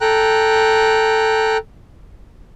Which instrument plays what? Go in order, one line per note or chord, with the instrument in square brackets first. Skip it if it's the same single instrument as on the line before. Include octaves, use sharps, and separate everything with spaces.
[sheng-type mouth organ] A4 G5 A#5 F#6